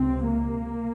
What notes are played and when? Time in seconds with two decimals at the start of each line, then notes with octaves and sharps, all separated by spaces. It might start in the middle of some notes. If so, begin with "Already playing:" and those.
Already playing: C#2 C3 C4
0.27 A#3